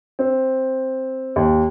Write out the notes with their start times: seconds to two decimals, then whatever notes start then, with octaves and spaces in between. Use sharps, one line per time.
0.19 C4
1.36 D#2